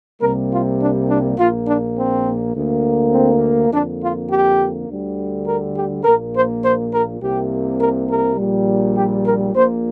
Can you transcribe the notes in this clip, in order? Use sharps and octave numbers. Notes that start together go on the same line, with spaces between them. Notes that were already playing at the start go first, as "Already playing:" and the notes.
C2 C3 G3 A#3 A#4
F4
D4
D4
A#1 A#2 A#3 F4
D4
C4
D2 D3 A#3
C4
F2 D3 A#3 D4
F4
G4
D2 D3 G3
A#4
G4
A#1 A#2 A#3 A#4
C5
C5
A#4
C2 C3 A#3 G4
A#4
A#4
A#1 A#2 G3
G4
A#4
A#1 A#2 A#3 C5